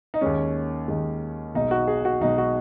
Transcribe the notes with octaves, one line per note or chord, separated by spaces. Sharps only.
D#4
D#2 D#3 G#3 C#4
D#2 D#3 G#3
B1 B2 G#3 D#4
F#4
G#4
F#4
B1 B2 G#3 D#4
F#4